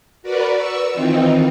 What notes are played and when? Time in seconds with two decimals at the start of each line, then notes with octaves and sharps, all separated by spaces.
0.22 F#4 A#4 B4 D5
0.56 C#6 E6
0.93 D#3 E3 C4 D#4 F4